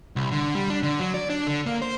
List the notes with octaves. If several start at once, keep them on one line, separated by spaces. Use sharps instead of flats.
C2
D3
G3
D4
D3
F#3
D5
D4
D3
A#3
C5